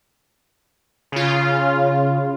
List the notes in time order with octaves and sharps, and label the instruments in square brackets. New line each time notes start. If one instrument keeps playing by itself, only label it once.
[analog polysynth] C#3 F4